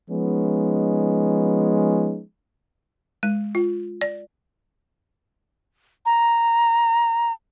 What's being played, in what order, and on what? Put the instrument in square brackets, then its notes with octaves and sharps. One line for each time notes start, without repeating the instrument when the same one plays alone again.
[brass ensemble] F3 G#3 B3 C#4 D#4
[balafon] G#3
F4
D5
[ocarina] A#5